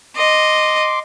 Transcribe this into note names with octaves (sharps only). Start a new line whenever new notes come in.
D#5 C6 D6